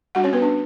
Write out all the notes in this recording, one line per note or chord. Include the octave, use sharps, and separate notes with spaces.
G3 D4 F#4 F#5
C#4 C#5
B3 B4
D4